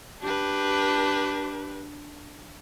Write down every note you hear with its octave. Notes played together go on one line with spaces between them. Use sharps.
D4 G4 B4